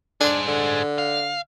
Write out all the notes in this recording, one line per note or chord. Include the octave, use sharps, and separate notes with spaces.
D4 G#4 C5
D3
F5